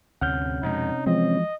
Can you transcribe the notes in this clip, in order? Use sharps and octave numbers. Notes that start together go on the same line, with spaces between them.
D2 G2 C3 C#4 F#5 F6 G6
F2 B2 G#3 D#4
E3 F3 G#3 C4 D#5